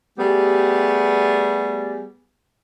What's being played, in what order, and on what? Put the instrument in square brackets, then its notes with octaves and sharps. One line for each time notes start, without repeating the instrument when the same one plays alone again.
[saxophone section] G3 A3 B3 G4 G#4